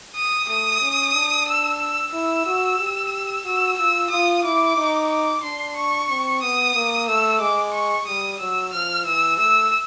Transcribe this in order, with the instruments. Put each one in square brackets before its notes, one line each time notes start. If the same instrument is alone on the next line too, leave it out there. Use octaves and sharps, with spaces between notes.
[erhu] D#6
[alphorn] A3 [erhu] D#6
[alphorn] C#4
D4
[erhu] E6
E6
[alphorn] E4 [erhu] E6
[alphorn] F#4
G4
[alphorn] F#4 [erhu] E6
[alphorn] F4 [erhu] E6
[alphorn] F4 [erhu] D#6
[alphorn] E4 [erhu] D6
[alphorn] D#4
[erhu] D6
[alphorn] D4 [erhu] C6
[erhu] C#6
[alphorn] C4
[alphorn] B3 [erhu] D#6
[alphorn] A#3
[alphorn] A3 [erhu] E6
[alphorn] G#3 [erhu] D6
[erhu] C#6
[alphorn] G3 [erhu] D#6
[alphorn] F#3 [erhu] E6
[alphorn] F3 [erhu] F6
[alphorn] E3 [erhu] E6
[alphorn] A3 [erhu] E6